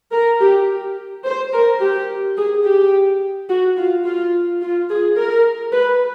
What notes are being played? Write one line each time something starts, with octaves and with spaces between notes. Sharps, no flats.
A#4
G4
C5
A#4
G4
G#4
G4
F#4
F4
F4
F4
G#4
A#4
B4